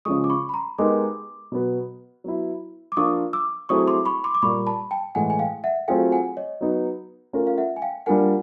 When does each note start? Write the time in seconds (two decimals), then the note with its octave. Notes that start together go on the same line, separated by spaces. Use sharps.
0.05 C#3 F3 G#3 C#6 D#6
0.24 D6
0.29 B5 C#6
0.49 B5
0.54 A#5 C6
0.78 G#3 B3 D#4 G4 A#4 C6 D6
1.52 B2 F#3 B3
2.24 F#3 B3 E4
2.92 D6
2.97 F3 A#3 D4 F4 C#6 D#6
3.33 D6 E6
3.69 F#3 A3 C4 E4 G#4 C#6 D#6
3.88 C6 D6
4.05 B5 C#6
4.24 C6 D6
4.35 D6
4.42 A#2 G3 A#3 B5 C#6
4.66 A5 B5
4.91 G5 A5
5.15 A2 E3 G#3 F#5 G#5
5.30 G#5
5.39 F5 G5
5.64 E5 F#5
5.88 F#3 A3 C4 F4 G#4 F5 G5
6.12 F#5 G#5
6.37 C#5 D#5
6.61 F#3 B3 D#4
7.33 A3 C#4 F4 A#4
7.47 F5
7.58 E5 F#5
7.76 G#5
7.82 F5 G5
8.06 G3 A#3 D4 F4 A#4 F#5 G#5